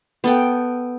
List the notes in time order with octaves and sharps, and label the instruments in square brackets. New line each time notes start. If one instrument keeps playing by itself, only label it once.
[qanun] B3 A4 G5